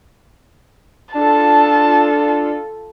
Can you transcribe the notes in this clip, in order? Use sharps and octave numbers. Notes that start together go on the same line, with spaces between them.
D4 F4 A4 A5